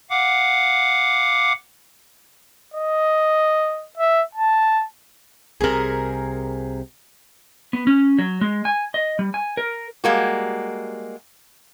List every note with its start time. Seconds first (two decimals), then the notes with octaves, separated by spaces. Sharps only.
0.10 F5 F#5 D6
2.74 D#5
3.97 E5
4.35 A5
5.61 C2 C3 G#4 A#4
7.73 B3
7.87 C#4
8.19 F#3
8.41 G#3
8.65 G#5
8.94 D#5
9.19 G3
9.34 G#5
9.57 A#4
10.04 G3 G#3 A#3 F#4